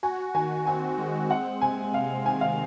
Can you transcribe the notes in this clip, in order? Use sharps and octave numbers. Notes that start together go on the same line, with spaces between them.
F#4 G#5
D#3 G#5
C4 G#5
G#3
C4 F#5
C3 G#5
G#3 F5
D#3 G#5
F5